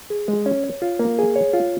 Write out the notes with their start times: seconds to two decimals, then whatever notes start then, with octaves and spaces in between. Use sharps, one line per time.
0.10 G#4
0.28 G#3
0.46 C#4
0.64 C#5
0.82 F4
0.99 A#3
1.19 G#4
1.36 C#5
1.53 F4